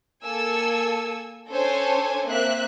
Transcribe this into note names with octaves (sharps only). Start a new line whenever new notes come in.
A#3 A4 G#5 E6
C#4 D4 A4 C5 C#5 G#5
A#3 C4 E5 F#6